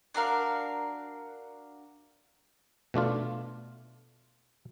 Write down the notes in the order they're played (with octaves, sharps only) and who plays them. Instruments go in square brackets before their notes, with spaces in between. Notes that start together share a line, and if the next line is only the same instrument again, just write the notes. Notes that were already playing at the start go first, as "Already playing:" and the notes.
[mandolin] D4 F#4 A#4 F5
[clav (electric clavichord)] B2 A3 D4 F4